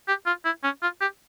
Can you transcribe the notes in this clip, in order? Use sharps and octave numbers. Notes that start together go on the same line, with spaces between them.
G4
F4
E4
C#4
F4
G4